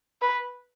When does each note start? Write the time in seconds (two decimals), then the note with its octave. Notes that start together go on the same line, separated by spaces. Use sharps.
0.22 B4